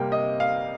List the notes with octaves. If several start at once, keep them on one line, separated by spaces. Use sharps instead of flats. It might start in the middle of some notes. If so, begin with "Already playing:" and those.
Already playing: C3 G3 A#3 G5
D#5
F5